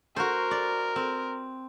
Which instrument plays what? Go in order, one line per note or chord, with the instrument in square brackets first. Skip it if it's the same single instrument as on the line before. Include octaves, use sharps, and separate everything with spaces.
[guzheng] F#4 C5 [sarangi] A#4
[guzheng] D5
C4